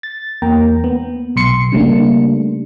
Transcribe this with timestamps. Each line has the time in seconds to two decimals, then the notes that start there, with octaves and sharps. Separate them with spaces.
0.03 A6
0.42 E2 A#3 G5 A#5
0.84 B3
1.36 B1 C6 C#7
1.72 C#3 G3 A3 A#3 D4